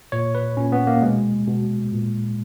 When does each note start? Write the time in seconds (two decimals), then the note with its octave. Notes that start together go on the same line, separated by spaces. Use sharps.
0.12 A#2 C#5
0.35 B4
0.57 A#2 C#4
0.72 B3
0.87 A#3
1.02 B2 G#3
1.48 B2
1.92 A#2